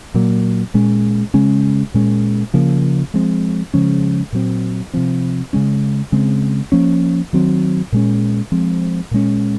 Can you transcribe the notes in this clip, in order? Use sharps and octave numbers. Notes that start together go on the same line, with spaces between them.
A#2 F#3 A#3
A#2 G#3 C#4
C#3 G#3 C#4
A#2 G#3 C#4
C#3 F3 A#3
F3 G#3 C4
C#3 F3 G#3 C#4
A#2 F#3 C4
C3 F3 C4
C#3 G#3 C#4
C#3 G#3 C4
F3 A#3 C#4
D#3 F#3 C4
A#2 G#3 C#4
F3 G#3 C4
A#2 G#3 C#4